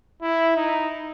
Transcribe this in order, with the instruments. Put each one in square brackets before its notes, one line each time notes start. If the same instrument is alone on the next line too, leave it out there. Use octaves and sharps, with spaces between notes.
[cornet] E4
D#4